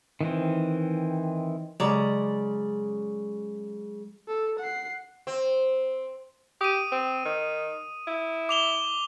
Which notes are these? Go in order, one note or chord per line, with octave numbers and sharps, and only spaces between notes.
D#3 E3 C4
C#3 F#3 G#3 D5 A#5
A4
F#5 C7
C4
G4 D#6 D#7
C4
D#3
E4
D6 F7 G7